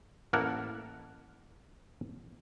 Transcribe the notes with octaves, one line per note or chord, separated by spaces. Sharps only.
A1 A#3 E4 A#4 F#5 A5